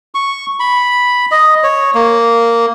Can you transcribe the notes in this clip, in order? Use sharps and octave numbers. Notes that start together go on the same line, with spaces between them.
C#6
B5
D#5
C#5
A#3